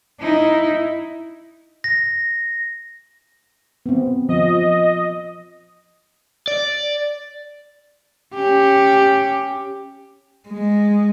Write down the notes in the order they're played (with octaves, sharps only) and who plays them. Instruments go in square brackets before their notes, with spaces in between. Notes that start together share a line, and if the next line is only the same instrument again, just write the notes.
[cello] D#4 E4
[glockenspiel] A#6
[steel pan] B3 C4
[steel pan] F3 [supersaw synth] D#5
[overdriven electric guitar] D5
[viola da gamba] C#4 G4
[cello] G#3